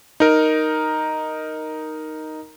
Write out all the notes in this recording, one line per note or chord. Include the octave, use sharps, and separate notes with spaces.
D#4 A#4